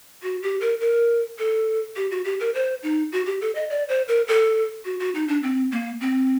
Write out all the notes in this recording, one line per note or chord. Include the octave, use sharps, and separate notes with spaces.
F#4
G4
A#4
A#4
A4
G4
F#4
G4
A#4
C5
D#4
F#4
G4
A4
D#5
D5
C5
A#4
A4
F#4
F#4
D#4
D4
C4
A#3
C4